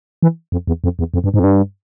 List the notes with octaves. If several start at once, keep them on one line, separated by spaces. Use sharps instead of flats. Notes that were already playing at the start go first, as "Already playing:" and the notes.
E3
F2
E2
F2
E2
F2
G2
G#2
F2
G2